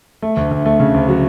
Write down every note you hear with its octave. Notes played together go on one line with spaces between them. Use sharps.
A3
D2
D2
A3
C#3
D2
F#3